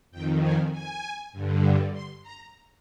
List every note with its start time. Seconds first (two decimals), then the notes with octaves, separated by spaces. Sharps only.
0.11 F2 D#3 G5
0.42 G#5
0.72 G#5
1.32 G2 D3
1.92 C6
2.23 A#5